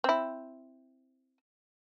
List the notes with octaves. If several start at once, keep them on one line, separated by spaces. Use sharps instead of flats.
C4 E4